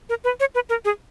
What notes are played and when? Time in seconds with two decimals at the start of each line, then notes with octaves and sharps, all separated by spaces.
0.09 A#4
0.24 B4
0.40 C#5
0.55 B4
0.69 A#4
0.85 G#4